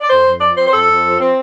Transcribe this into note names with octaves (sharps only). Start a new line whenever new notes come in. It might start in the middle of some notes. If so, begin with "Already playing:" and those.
D5
F2 C5
F2
F3 D5
C4 C5
C5
F2 A4
F2
F3
C4